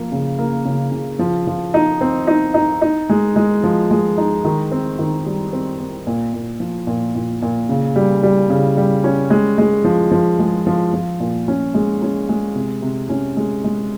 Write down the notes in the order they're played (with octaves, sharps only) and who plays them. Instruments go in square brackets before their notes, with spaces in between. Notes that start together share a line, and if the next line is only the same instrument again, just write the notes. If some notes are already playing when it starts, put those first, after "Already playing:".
Already playing: [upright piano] F3 A#3
C#3
A#3
C#3
C#3
F3
F3
D#4
C4
D#4
D#4
D#4
G#3
G#3
F3
G#3
D#4
D#3
C4
D#3
G3
C4
C4
A#2
A#2
F3
A#2
A#2
A#2
C#3
G3
G3
C#3
G3
C#4
G#3
G#3
F3
F3
G#3
F3
F3
A#2
C#4
G#3
C#4
G#3
C3
C3
C#4
G#3
G#3